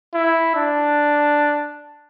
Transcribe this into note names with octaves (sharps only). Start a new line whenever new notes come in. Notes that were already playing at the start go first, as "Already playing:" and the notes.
E4
D4